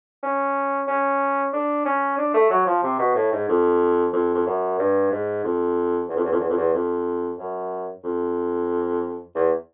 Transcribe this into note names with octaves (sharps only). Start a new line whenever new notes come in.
C#4
C#4
D4
C#4
D4
A3
F#3
F3
C3
B2
A2
G#2
F2
F2
F2
F#2
G2
G#2
F2
E2
F2
E2
F2
E2
F2
E2
F2
F#2
F2
E2